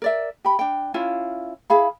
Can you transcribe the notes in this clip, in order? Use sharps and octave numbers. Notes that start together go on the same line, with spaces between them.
A#4 D5 E5
G4 B5
D4 G5
C#4 E4 F4 F5
E4 G#4 F5 B5